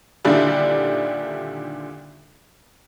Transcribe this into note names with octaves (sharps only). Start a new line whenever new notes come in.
A#2 D3 D#3 G3 D4 E4